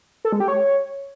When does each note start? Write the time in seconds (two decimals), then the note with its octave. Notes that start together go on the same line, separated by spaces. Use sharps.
0.25 A4
0.32 G#3
0.40 G4
0.48 C#5